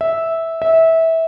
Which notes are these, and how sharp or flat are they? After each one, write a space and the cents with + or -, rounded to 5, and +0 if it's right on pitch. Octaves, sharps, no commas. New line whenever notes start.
E5 -10
E5 -20